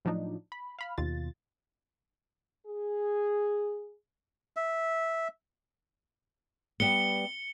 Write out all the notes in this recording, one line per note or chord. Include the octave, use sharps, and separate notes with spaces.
A2 F3 F#3 D4 D#4
B5
F5 B5 F6
D#2 B2 F4 A6
G#4
E5
G3 B3 C#7 G7